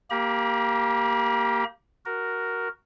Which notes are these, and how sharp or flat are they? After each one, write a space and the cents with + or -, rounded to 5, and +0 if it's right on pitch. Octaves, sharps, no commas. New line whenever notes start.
A#3 -5 G4 +0 A#5 +45
F#4 +10 A#4 +0